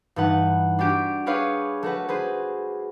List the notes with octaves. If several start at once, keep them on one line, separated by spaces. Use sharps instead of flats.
G2 E3 D#4 B4 F#5
D4 F#4 G4 D7
G4 G#4 B4 C#5 F5
A3 F#4 B4
G#4 B4 C5